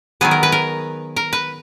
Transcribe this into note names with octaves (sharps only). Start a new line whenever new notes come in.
D#3 F#3 B3 G#4
A#4
B4
A#4
A#4
B4